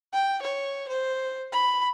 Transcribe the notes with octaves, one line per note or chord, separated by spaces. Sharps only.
G5
C#5
C5
B5